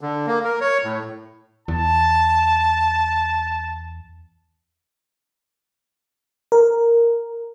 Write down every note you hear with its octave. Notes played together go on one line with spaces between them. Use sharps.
D3
A#3
A#4
C#5
A2
E2 A5
A#4